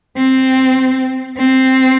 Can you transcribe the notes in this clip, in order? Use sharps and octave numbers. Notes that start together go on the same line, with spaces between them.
C4
C4